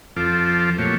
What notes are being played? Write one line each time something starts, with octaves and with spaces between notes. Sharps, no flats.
F2 F3 C4 F4 A4 D6
A#2 F3 F#3 A3 G4 C#5